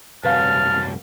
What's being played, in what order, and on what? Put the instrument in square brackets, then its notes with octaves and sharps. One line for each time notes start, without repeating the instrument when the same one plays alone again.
[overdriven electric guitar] C2 F#2 [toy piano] B4 F5 F#5 [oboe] A5 [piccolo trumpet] F6